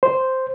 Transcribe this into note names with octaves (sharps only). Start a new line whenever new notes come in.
C5